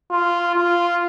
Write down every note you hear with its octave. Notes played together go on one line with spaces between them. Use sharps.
F4
F4